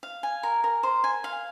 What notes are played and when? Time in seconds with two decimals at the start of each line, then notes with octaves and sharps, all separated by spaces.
0.03 F5
0.23 G#5
0.43 A#4
0.64 A#4
0.83 C5
1.04 G#5
1.24 F5